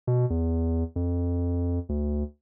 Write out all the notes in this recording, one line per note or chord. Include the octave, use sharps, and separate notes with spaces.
B2
E2
F2
D2